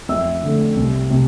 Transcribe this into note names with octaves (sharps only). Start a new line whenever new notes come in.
F2 E5 E6
D3 A3
C2
C3